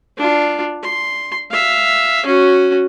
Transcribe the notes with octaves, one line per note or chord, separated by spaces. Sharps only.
D4 F4
C6
E5 F5
C#4 F#4